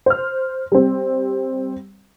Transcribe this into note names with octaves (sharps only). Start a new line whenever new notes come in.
C5 F6
G3 C4